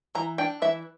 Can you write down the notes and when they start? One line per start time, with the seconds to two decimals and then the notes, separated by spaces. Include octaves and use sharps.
0.15 E3 A#5
0.38 D4 G5
0.62 E3 E5